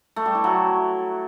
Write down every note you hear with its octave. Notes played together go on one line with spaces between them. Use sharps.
A3
G3
E4
F#3